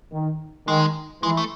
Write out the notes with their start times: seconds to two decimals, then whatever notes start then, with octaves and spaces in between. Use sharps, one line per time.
0.12 D#3
0.68 D#3 G#3
1.23 E3 G#3
1.37 A3